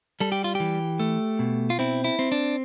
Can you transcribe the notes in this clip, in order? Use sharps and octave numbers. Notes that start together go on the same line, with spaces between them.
G3 A4
G4
F4
E3 G4
A3
B2
F4
C4 E4
E4
C4
D4